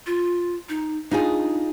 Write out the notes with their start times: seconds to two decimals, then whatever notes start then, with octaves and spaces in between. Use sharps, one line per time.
0.06 F4
0.69 D#4
1.11 D4 D#4 F4 G#4